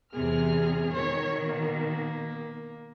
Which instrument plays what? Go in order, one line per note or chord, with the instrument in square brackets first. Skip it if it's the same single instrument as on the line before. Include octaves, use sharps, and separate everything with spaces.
[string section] E2 C3 F6 [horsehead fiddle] G#4
[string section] B2 D#3 [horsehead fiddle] C#5
[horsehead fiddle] A#3